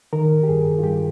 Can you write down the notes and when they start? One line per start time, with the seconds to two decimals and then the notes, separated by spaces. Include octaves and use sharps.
0.13 D#3 A#4
0.43 G4
0.48 G2 G#4
0.78 F4
0.84 G2 G4